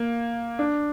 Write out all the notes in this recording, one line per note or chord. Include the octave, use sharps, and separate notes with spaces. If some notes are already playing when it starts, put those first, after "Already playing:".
Already playing: A#3
D4